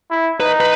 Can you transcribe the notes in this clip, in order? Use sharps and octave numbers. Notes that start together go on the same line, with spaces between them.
E4
D#4 B4
B4